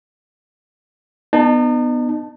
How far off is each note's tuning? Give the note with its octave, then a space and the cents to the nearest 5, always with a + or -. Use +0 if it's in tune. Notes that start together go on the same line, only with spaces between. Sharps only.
B3 +0 D#4 -40 A5 +5